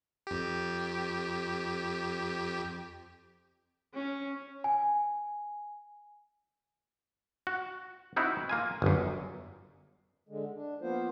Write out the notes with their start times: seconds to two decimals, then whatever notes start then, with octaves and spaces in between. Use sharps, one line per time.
0.27 F2 G4
3.94 C#4
4.64 G#5
7.47 F#4
8.16 C4 D#4 E4 F#4
8.50 A#3 F4 G#5
8.82 G1 F#2
10.29 D3 G#3
10.55 D4
10.81 F3 A#3 B3 F4 C5